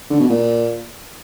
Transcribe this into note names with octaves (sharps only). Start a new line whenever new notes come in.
D3
B2
A#2